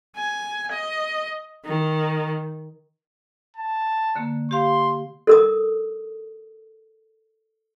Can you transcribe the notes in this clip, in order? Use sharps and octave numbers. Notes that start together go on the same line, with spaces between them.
G#5
D#5
D#3
A5
D3 A#3
G4 F5 C6
A4 A#4 D#6